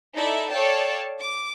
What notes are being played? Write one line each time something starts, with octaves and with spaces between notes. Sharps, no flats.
D#4 E4 A4 D5 E5
A4 C#5 D5 F5 G5 A5
D6